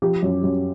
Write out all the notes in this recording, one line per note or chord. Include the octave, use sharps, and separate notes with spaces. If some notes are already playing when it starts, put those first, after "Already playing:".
F3 G4
F#2
F#2